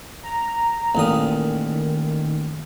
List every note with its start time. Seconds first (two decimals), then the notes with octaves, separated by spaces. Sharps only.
0.23 A#5
0.95 A1 A#2 D#3 D#6